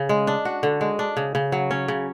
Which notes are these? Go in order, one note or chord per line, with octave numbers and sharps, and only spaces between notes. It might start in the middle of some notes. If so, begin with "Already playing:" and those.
Already playing: C#3
G#3
D4
F#4
D3
G#3
D4
C#3
C#3
F#3
C#4
C#3